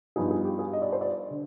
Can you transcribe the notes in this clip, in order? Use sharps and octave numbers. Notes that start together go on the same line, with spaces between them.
G2 F3 B3 D#4 G#4
G#4
G4
G#4
D#5
D5
C5
D5
D3